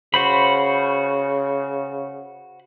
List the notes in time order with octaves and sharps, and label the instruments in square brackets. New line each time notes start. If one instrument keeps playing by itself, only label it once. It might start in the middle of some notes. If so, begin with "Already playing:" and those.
[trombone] C#3 [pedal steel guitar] F#4 C5 B5